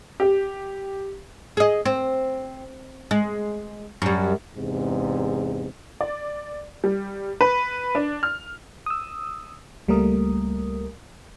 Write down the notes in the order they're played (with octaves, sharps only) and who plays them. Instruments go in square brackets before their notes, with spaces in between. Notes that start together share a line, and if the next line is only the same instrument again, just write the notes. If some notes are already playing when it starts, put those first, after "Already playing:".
[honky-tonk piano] G4
[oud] G#4 D#5
C4
G#3
F#2 G3
[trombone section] E2 G#2 C3
[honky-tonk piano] D5
G3
B4
D4
F6
[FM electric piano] D#6 E6
C#2 G3 A3 A#3 A#4 D#6